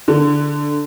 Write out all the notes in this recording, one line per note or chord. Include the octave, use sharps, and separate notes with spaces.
D3